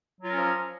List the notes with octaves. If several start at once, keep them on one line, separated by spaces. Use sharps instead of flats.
F3 F#3 C#4 F4 A#4